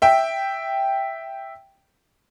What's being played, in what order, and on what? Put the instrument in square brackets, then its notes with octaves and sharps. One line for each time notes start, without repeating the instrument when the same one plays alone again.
[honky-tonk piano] E5 G5